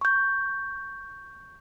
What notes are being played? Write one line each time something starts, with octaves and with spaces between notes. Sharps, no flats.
C#6 G6